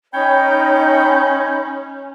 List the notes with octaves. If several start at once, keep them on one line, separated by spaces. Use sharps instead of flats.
C#4 D#4 C#5 G5 B5 G6